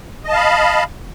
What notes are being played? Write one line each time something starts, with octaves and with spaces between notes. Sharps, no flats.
D#5 F5 A5 B5